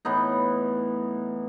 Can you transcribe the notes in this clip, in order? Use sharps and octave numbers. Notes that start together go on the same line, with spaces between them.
A2 E3 B3 D#4